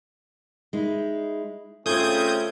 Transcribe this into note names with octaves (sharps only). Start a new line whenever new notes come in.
G#3 D#4 E4
C#3 A3 C4 C#4 F4 D#6 G6 G#6